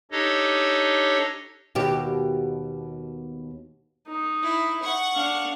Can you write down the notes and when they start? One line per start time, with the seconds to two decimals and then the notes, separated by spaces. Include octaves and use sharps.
0.11 D4 D#4 G4 A4 C#5 D#5
1.75 D#2 B2 G4
4.08 D#4
4.42 E4
4.83 F#5 C#6
5.15 D4 F5